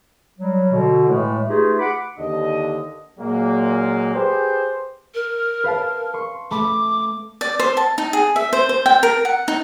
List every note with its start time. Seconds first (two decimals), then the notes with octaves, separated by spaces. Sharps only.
0.40 F#3 G3
0.72 B2 D3
1.07 A2 E3 G#3 A3
1.48 A3 D#4 F4 G4 G#4 B4
1.79 F#5 B5 D6
2.18 D#2 D3 D4 G4 D#5
3.19 A#2 F#3 G#3 A#3
4.13 G4 G#4 B4 C5
5.14 A#4
5.64 B4 F5 A5
6.14 C6 C#6
6.51 A3 B5 D6
7.41 D5
7.60 C5
7.77 A5
7.98 D#4
8.13 G#4
8.36 E5
8.53 C5
8.69 C5
8.86 G5
9.03 A#4
9.25 F#5
9.48 D#4